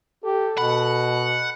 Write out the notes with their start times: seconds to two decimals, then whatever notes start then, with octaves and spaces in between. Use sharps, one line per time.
0.25 G4 A4
0.58 B2 F#5 B5